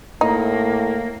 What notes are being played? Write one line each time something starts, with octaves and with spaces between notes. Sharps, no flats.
A2 A#3 D#4